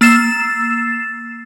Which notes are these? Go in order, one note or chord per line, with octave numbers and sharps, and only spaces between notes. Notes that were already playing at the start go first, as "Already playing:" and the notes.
A#3 E6 A6 C7 E7